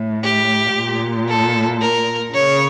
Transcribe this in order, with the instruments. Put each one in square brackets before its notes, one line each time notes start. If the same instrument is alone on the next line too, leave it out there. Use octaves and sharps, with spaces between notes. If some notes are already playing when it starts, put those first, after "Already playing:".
Already playing: [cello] A2
[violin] G4
[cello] A#2
[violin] A4
A#4
[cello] C#3 [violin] C#5